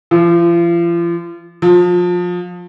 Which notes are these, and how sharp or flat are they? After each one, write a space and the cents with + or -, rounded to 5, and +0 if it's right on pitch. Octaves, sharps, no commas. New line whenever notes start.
F3 -40
F3 +25